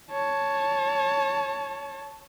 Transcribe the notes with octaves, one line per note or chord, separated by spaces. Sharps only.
C#5 A5